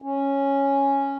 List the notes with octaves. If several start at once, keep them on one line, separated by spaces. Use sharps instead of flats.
C#4